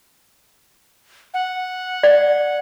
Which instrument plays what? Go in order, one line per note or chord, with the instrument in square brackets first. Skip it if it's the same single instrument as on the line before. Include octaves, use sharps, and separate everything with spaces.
[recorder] F#5
[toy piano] D5